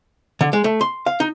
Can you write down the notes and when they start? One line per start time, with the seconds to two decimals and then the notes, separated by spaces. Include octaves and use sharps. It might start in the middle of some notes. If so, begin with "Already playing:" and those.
0.41 D3
0.53 G#3
0.64 A3
0.81 C6
1.06 F5
1.20 D#4